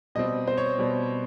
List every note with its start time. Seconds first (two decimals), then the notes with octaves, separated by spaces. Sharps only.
0.15 B2 G3 C4 D#5
0.47 C5
0.58 C#5
0.78 B2 G3 C4